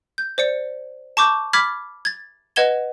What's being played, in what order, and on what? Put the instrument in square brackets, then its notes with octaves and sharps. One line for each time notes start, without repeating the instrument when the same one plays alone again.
[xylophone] G6
C5 D5 C#7
A5 C#6 D6 G6
B5 D6 F6 G#6 A6 B6
G#6 A6
B4 D#5 F#5 G#6 E7 G7